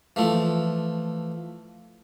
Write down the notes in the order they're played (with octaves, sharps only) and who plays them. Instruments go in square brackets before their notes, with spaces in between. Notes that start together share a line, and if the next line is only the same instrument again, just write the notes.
[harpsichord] E3 F3 A3